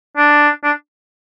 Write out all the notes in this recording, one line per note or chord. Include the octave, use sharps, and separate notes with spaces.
D4
D4